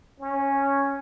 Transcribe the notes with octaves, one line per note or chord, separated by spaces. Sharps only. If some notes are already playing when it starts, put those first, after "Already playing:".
C#4